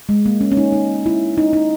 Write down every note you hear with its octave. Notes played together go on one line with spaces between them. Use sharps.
G#3
A#3
C#4
C#4
D#4
D#4
E4
D#4
D#4